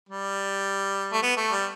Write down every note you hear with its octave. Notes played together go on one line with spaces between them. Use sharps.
G3
A3
B3
A3
G3